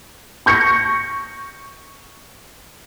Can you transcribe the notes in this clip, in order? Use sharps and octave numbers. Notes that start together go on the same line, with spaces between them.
C#6 G6 A#6 C#7